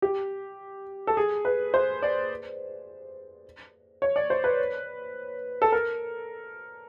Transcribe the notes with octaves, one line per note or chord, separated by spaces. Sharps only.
G4
A4
G#4
B4
C5
D5
C#5
D5
C5
B4
A4
A#4